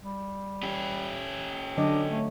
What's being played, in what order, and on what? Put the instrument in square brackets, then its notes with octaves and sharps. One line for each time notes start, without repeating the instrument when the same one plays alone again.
[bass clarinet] G3
[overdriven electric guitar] C#4 G4
[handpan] D3 F#3 D#5 [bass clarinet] D4
[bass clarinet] A3